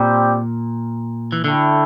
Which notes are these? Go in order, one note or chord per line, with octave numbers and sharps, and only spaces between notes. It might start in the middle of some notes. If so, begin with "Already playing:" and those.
Already playing: A#2 G3 C4 G4 D5 G5
E3
D3 A3 E4 A4 E5 G5